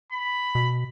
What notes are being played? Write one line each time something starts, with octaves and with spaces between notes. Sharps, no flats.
B5
B2